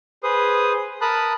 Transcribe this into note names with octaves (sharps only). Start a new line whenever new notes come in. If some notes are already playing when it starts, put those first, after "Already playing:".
G#4 B4 C5 D#6
A#4 A5 B5 D#6 F#6